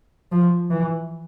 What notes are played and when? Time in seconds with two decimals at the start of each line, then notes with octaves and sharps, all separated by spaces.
0.32 F3
0.71 E3